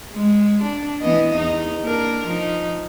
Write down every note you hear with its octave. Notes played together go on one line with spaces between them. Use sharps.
G#3
D4
E3 B3 D#5
E2 D#4
A#3 D4 A#4
F3 D#4